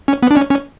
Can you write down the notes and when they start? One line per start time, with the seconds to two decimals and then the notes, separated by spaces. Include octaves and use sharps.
0.08 C#4
0.23 B3
0.31 D4
0.37 C#4
0.50 C#4